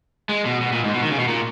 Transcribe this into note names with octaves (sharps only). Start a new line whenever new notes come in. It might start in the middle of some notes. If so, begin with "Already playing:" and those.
G#3
B2
B2
A#2
G#2
B2
D#3
C#3
B2
A#2